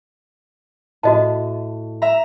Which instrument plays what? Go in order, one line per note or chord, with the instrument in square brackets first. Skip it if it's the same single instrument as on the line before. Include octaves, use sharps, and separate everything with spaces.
[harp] A2 [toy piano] F#4 D#5 A5
[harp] E5 A#5